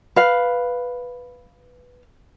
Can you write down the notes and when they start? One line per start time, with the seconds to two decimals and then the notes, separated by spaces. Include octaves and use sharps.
0.16 B4 F5